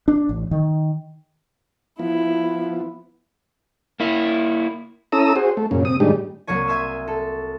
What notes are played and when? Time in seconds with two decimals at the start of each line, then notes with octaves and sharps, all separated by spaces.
0.08 D4
0.29 A1
0.51 D#3
1.99 F3 B3 E4
4.00 A#3 E4
5.12 C#4 E4 A4 A#5 D#6 E6
5.36 F#4 G#4 C5
5.57 A3
5.71 F#2 A#2 C#3
5.85 C3 D#6
6.00 A2 D#3 G3 G#3 D4 G4
6.47 C2 F#3 A#3 C#5 G#5
6.68 E5 G#5 C6 E6
7.08 A4